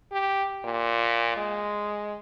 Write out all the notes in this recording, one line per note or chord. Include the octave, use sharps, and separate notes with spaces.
G4
A#2
G#3